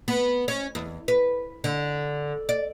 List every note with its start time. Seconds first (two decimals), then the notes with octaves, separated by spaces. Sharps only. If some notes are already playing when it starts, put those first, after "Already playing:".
0.08 B3
0.48 C#4
0.75 E2
1.08 B4
1.64 D3
2.49 D5